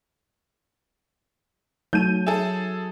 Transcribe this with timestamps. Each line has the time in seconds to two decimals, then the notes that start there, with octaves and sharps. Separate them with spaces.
1.93 F#3 A3 D#4 G6 D#7
2.27 G#4 A4 E5